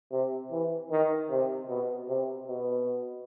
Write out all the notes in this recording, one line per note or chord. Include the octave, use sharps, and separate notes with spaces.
C3
E3
D#3
C3
B2
C3
B2